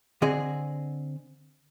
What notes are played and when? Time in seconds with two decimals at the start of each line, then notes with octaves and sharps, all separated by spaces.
0.22 D3 C4 G#4 D#5